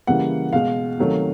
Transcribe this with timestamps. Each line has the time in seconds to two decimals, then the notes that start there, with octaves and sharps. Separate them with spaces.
0.07 C#3 E3 G3 A#3 F#5
0.53 B2 G#3 F5
0.98 C3 D#3 F#3 A3